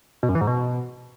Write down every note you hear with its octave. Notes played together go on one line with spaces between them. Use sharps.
B2
F#2
E3
G#2
B2